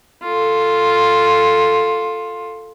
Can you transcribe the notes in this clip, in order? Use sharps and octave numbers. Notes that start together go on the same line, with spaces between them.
F4 A4